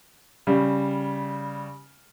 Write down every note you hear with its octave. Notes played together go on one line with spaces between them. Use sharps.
C#3 G3